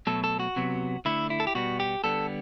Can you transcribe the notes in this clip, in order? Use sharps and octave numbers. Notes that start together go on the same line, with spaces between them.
B2 F#3 A3 A4
A4
F#4
C3 F#3 B3
D3 A3 E4
E4
A4
G4
B2 G3 B3 F#4
G4
D3 G3 B3 A4